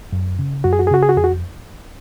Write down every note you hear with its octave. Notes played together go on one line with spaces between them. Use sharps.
F#2
C#3
F#2 F#4
G#4
F#4
G#4
C#3 F#4
G#4
F#4
F2 G#4
F#4